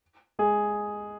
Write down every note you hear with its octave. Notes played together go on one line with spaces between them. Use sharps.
G#3 G#4